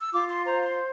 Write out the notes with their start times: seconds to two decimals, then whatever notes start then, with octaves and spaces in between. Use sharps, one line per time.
0.01 E6
0.12 F4 D6
0.29 C6
0.45 C5 A#5
0.62 C6